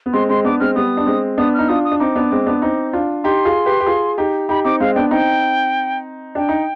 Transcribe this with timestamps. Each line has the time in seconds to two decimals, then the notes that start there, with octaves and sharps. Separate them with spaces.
0.06 B3
0.13 G#3 C4 C6
0.29 G#3 C4 C6
0.45 B3 D4 D6
0.60 G#3 C4 F6
0.75 G3 B3 D#6
0.97 D4
1.07 G#3 C4
1.38 B3 D4 D#6
1.54 D#4 F6
1.68 D4 F4 D#6
1.85 D#6
1.92 D4
2.00 C4 D#4 D6
2.16 B3 D4
2.31 G#3 C4
2.47 B3 D4
2.62 C4 D#4
2.93 D4 F4
3.24 D#4 G4 C6
3.45 F4 G#4
3.66 G4 B4
3.80 G4
3.86 F4 G#4
4.18 D#4 G4
4.49 D#4 G4 B5
4.65 C4 D#4 D6
4.80 G#3 C4 F5
4.95 B3 D4 G5
5.11 C4 D#4 G5
6.35 D4 G5
6.49 D#4